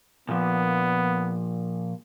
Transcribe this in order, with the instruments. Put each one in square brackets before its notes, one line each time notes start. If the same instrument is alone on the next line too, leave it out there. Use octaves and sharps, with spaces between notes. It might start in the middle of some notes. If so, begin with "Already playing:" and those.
[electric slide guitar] A#2 F3 [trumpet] B3